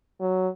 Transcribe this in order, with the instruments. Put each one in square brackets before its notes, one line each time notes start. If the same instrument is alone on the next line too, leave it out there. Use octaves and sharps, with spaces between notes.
[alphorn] F#3